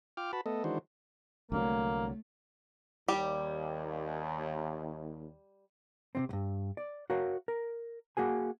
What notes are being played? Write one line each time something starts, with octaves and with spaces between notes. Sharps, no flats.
F4 G5 D6 F6
F#4 B4 A5 B5
A3 B3 A4 D#5
D#3 E3 G#3 D4 F#4 C5
C2 D3 F#3 A3 A#3
D#2 G3 G4
C3 D#3 C4
B1 G2
D5
F#4 A#4 C#5 F5
A#4
A#3 F#4 G#4 G#5